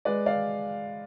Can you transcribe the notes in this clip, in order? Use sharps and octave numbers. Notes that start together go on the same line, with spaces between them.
G#3 B4 D5
D5 F5